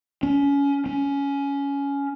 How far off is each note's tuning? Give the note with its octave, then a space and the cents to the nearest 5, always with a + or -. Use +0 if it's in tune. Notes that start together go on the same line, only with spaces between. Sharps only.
C#4 +25
C#4 +15